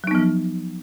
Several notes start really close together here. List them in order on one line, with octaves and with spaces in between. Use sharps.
F#3 D#4 B3 F3